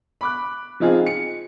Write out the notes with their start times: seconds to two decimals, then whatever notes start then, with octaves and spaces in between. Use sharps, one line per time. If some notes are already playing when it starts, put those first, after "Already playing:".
0.21 B5 D6 F#6
0.80 F3 C4 D#4 F4 G#4
1.06 C#7